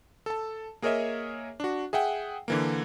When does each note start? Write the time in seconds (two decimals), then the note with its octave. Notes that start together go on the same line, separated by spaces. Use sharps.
0.26 A4 A5
0.82 A#3 G#4 A#4 C#5 D#5 E5
1.60 D4 F#4
1.93 G#4 E5 F#5 G5
2.48 D3 E3 A#3